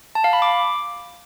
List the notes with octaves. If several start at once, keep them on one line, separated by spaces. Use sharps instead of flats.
A5
F5
B5
D6